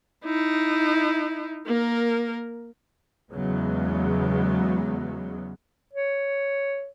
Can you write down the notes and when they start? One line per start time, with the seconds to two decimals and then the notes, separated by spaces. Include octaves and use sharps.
0.24 D#4 E4
1.66 A#3 A#4
3.31 E2 C#3 F#3 G#3 B3
5.93 C#5